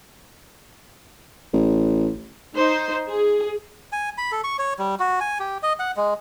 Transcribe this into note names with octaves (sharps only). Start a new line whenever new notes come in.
A1
D#4 C5
G#4
G#5
B5
A4
C#6
C#5
G3
F#4
G#5
G4
D#5
F#5
G#3